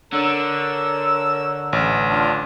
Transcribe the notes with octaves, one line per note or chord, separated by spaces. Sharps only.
D3 A#4 C#5 E6
A1
D4 F4